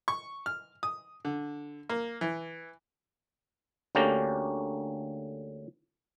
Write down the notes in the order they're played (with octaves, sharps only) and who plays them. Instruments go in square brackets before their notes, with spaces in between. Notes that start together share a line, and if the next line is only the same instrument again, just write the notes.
[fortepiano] C#6
F6
D#6
D3
A#3
E3
[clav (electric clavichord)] D2 D3 A#3 C#4 G4 A#5